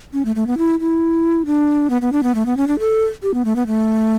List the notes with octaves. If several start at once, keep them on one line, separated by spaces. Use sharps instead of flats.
C#4
A3
A3
B3
E4
E4
D4
B3
B3
D4
B3
A3
B3
C#4
D4
A4
G4
B3
A3
B3
A3